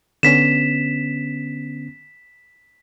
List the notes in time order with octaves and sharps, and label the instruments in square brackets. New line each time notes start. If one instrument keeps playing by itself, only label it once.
[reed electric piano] D3 B3 C#4 [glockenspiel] B6 E7